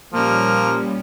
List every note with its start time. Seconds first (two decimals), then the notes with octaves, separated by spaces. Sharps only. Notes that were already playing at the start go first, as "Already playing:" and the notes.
0.13 A#2 F3 G3 A#3 C#4